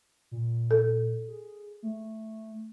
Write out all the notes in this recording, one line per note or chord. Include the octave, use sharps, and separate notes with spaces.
A#2
A4
G#4
A3